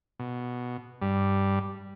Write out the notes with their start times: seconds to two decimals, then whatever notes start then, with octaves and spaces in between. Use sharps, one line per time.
0.19 B2
1.01 G2 G3